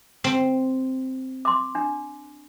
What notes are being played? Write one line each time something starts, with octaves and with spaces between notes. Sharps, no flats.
C4
C6 D6
D4